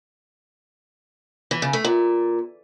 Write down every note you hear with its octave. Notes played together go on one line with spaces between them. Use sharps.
E3
C#3
A3
A#2